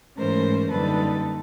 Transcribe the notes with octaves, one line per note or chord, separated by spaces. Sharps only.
G#2 E3 A3 C#4 A#4 C5
F#2 D3 G3 A#3 D#4 A4 B4